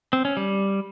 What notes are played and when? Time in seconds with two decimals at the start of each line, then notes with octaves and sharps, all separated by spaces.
0.13 C4
0.25 C#4
0.37 G3